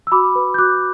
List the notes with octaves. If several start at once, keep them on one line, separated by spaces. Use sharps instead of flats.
E6
F#4 B5 D6
B4
G6
F#4 D6 F#6